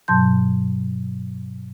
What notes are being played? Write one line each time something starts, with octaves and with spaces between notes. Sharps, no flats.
G2 B2 F#3 A5 C6 G6